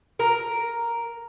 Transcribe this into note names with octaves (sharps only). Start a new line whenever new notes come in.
A#4